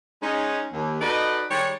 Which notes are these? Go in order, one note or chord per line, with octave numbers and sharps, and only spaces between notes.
G#3 C#4 D#4
D#2
D#4 F#4 A4 B4 D5 D#5
D#3 G3 G#3 G4 C#5